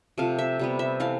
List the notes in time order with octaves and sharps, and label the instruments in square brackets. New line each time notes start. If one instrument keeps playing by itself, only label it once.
[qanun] C3 F3 A3 F5
E5
C3 G3 B3
E5
E3 A3 F5